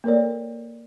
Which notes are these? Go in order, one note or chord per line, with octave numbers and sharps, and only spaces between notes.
A#3 A4 A#4 C#5 D5